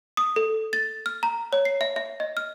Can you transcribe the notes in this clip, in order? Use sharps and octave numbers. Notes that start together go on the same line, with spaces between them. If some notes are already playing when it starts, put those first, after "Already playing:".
D#6
A4
A6
F6
A#5
C#5
C7
E5
E5
D#5
F6